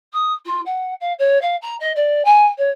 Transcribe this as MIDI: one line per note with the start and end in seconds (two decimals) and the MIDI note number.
0.13 0.33 87
0.45 0.61 65
0.65 0.94 78
1.00 1.13 77
1.18 1.40 73
1.41 1.56 77
1.61 1.75 82
1.80 1.92 75
1.95 2.22 74
2.25 2.46 80
2.58 2.70 73